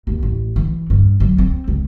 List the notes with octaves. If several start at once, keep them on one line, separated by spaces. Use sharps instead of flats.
D#2
A1
E3
G2
F#3
C4
C#2